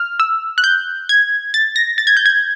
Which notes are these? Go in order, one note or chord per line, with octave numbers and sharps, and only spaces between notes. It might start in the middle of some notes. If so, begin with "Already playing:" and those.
Already playing: F6
E6
F#6
G6
G#6
A6
A#6
A6
G#6
G6
G#6